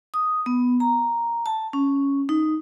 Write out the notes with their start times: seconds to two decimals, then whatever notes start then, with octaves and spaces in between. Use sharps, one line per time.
0.14 D#6
0.46 B3
0.80 A#5
1.46 A5
1.73 C#4
2.29 D#4